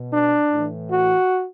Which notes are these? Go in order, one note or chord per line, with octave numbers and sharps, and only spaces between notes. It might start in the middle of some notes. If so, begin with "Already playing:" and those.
Already playing: B2
D4
A2 E3
F#4